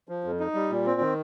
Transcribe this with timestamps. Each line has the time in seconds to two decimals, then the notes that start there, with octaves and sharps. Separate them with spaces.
0.09 F3
0.24 F2
0.40 D#4
0.55 G3
0.70 A#2
0.86 C4
1.01 D#3